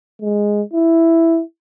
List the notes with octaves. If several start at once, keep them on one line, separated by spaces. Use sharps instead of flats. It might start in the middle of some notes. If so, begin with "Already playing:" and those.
G#3
E4